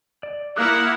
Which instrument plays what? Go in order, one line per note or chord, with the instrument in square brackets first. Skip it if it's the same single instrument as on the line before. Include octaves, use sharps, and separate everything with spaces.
[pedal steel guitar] D5
[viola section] A#3 E4 F#5 [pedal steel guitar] D6 D#6 F#6